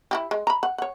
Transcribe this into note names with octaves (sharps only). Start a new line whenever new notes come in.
E4 F#4 G4
G#3
A#5 B5
F#5
C#5 F#5